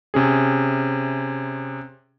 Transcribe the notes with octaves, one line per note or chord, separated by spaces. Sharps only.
C3 C#4 G#4